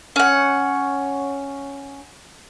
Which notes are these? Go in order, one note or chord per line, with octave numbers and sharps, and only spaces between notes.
C#4 F#5